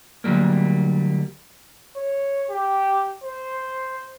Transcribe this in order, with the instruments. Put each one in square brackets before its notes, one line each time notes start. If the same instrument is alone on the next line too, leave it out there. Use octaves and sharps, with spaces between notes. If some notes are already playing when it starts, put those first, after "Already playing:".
[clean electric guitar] D2 C3 F#3 G3 A#3
[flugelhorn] C#5
G4
C5